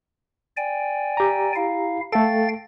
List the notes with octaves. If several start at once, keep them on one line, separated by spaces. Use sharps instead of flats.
D5 G5 G#5
G4 A#5
E4 F5
A3 A4 F5 G5 A6